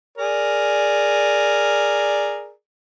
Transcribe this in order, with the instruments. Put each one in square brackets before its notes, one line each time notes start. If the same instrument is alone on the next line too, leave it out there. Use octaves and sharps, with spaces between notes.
[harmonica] G#4 A#4 D5